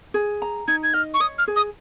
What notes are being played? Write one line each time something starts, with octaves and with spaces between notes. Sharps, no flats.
G#4
A#5
D#4 G#6
G#6
D#5 F6
C#6
C#5 D#6
F6
G#4
D#6